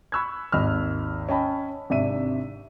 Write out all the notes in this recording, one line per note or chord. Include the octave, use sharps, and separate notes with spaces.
B5 C#6 E6 F#6 G#6
G#1 D#2 D#5 B5 E6 F6
C#4 D#5 G5 A5 B5
G#1 C3 D4 E5 D#7